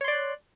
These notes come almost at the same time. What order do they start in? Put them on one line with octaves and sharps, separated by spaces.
C#5 C6 D5 F#6